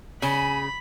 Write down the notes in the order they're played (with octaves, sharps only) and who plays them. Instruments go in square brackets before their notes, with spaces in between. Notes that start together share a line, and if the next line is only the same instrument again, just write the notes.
[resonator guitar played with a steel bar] C#3 [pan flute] G#5 [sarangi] B5